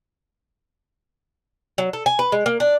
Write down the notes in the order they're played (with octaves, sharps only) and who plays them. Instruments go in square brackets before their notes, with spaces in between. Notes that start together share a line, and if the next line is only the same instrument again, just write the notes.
[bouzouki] F#3
A4
G#5
B4
G#3
A#3
D4